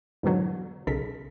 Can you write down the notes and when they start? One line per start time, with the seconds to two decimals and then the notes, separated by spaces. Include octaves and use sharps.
0.23 E2 G#2 B2 D3 F#3
0.87 B1 C#3 A4 A#4 B6